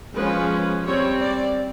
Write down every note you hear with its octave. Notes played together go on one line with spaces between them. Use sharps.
F3 G#3 C#4 B4
G3 C4 C#5
D5